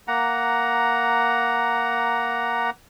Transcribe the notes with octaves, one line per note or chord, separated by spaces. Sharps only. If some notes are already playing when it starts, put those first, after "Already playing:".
A#3 F#5 A#5